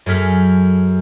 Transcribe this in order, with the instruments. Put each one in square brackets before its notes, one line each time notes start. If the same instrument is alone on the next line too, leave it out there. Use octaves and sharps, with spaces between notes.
[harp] F#2 G#4 A4 F6 B6